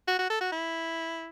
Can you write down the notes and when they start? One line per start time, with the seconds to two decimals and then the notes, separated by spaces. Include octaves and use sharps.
0.08 F#4
0.19 F#4
0.30 A4
0.41 F#4
0.52 E4